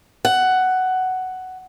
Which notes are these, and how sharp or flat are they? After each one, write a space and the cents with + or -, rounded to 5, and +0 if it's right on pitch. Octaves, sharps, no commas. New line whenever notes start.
F#5 +10